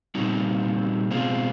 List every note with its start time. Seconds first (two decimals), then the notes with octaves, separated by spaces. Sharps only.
0.15 A#2 G3 C4 D#4 F#4
1.11 B2 G#3 C4 F4